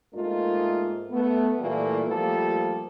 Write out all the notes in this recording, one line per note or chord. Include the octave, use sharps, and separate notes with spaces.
G#2 A3 A#3 D#4 F4
A3 B3
A#2 E3 G3 A3 A#3
F3 G3 A3 A#3 A4